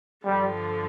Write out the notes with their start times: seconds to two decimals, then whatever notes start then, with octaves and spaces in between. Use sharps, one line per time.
0.25 G2 D3 F3 G3